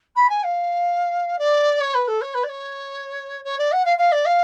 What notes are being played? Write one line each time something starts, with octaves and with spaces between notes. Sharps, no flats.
B5
G#5
F5
D5
C#5
B4
A4
C#5
B4
D5
C#5
C#5
D5
F#5
F5
F5
D5
F5